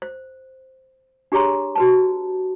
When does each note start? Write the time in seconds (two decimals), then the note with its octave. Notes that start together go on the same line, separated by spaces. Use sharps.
0.02 C5
1.32 D4 G4 G#4 C#5 A#5 C6
1.76 F#4 B4 A5